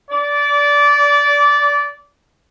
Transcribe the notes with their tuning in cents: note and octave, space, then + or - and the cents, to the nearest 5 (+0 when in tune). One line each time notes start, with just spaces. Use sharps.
D5 -20